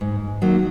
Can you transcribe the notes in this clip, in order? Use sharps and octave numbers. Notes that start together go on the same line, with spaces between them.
G#2
D#3 F#3 A#3